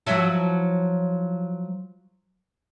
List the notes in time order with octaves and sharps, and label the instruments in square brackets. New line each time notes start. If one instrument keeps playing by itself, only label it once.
[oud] F3 F#3 E4